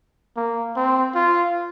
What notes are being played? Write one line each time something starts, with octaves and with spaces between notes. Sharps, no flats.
A#3
C4
F4